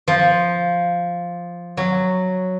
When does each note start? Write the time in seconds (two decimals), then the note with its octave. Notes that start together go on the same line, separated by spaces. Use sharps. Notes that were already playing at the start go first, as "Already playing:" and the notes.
0.08 F3
1.77 F#3